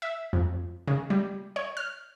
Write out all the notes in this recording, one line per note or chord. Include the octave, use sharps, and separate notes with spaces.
E5
F2
C#3
G3
C#5
F6